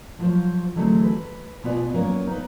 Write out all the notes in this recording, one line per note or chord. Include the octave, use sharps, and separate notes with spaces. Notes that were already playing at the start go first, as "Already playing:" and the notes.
F3 F#3 F4 A#4 C5 C#5
D3 E3 F#3 G#3 A3 C4
B4
B2 B3 F4 C#5 D5 G#5
F#3 A#3 B3 C#4 A#4 F5
D#4 B4